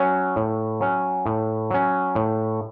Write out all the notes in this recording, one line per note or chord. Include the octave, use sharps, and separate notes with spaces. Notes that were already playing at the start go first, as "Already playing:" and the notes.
Already playing: F#3 C#4
A2
F#3 C#4
A2
F#3 C#4
A2